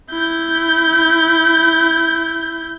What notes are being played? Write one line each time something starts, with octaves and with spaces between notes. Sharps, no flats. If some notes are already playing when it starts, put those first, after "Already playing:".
E4 G6